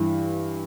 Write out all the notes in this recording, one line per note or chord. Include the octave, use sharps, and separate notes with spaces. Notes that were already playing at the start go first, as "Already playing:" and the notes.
Already playing: G2 E3